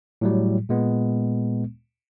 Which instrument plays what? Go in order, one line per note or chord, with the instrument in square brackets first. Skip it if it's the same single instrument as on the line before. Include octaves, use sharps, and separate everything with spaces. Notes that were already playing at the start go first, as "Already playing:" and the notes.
[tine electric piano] A2 F#3 G3
A#2 G#3 B3